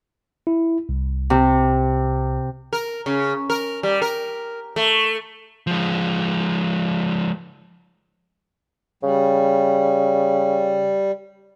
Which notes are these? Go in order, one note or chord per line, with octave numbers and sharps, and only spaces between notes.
E4
C2
C3
A#4
C#3
A#4
G3
A#4
A3
F3 G#3
C#3 G3